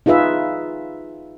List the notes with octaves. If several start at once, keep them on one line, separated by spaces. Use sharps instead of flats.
D#4 F4 G#4 B4 E5